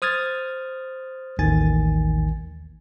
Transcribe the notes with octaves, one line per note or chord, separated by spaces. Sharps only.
C5 D#6 F6 G#6 A6
A1 D#2 D#3 G#5 A6